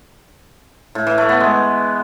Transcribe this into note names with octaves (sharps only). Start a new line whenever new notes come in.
A2
E3
A3
B3
G#3